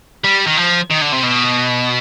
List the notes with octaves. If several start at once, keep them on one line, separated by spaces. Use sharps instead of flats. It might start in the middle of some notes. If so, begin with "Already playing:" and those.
G3
D#3
F3
D#3
D3
C3
B2